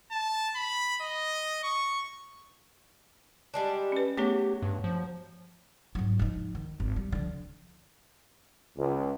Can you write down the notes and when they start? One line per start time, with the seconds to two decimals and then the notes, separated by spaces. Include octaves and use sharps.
0.11 A5
0.56 B5
1.02 D#5
1.64 C#6
3.54 G3 G#3 D4
3.92 C#4 B4
4.17 F#3 A3 B3 G4 G#4
4.62 G2
4.84 F3
5.95 G#2 F#3
6.19 F3 D#4
6.55 D#3
6.80 G#1
6.96 G3
7.12 D3 F3
8.77 C#2